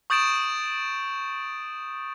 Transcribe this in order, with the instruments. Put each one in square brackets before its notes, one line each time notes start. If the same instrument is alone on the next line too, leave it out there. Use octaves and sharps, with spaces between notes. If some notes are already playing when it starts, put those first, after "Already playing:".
[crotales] C#6 D#6 G6 A6 D7 E7